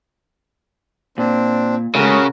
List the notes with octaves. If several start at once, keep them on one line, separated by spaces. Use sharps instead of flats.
A#2 C4 D4
C#3 G#3 A3 C#4 F#4 A#4